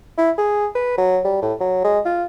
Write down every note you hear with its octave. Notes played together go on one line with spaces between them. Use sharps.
E4
G#4
B4
F#3
G3
A2
F#3
G#3
F4